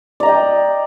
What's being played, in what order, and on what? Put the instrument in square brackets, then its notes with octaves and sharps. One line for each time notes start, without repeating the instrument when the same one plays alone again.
[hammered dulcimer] D5
A#5
D#5
G5